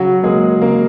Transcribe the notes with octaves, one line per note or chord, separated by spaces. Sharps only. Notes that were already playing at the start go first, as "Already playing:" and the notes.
Already playing: C#3 F#3 F#4
F#3 G#3 A#3 G#4
C#3 A#3 A#4